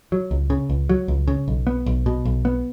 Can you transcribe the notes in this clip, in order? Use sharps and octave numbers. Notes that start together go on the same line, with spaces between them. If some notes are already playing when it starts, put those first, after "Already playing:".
F#3
C#2
C#3
C#2
F#3
C#2
C#3
B1
B3
B1
B2
B1
B3